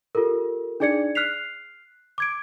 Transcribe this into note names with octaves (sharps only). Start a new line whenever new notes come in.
F4 G4 A4 A#4
D4 D#4 G#4 D5 G#6 C#7
F6 F#6 B6 C7 F7
D6 G#6 D7